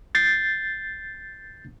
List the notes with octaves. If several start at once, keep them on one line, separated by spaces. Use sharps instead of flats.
G6 A6 C7